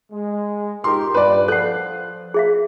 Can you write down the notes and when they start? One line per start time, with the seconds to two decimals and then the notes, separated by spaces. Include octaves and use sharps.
0.12 G#3
0.84 D#4 G4 A#4 C6
1.14 G2 B4 D5
1.48 F3 A4 F#5 F#6
2.34 G#4 E5 F5